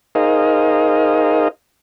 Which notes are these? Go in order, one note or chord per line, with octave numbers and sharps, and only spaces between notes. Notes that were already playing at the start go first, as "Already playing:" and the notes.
D#4 G#4 A#4 C5 D#5 F5